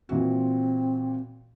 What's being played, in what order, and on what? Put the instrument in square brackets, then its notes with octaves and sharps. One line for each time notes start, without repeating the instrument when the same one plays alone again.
[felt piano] A#2 E3 F#4 [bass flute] C4